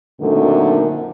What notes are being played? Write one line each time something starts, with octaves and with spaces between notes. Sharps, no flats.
F#2 A#2 D3 D#3 A3 C4